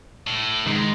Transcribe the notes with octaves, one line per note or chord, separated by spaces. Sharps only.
A2
G#2 D#3 G#3 D#4